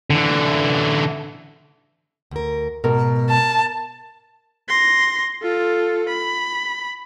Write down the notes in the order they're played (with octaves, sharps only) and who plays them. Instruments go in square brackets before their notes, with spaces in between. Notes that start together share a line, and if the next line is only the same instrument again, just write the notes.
[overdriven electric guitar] D3 E3
[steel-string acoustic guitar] D2 A#4
[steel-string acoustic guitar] G#2 B2 [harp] A#4
[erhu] A5
[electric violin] C6 A#6
F4 A4
B5